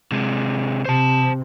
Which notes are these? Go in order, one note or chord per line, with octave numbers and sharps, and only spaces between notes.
C3 G#3
C3 C5 A5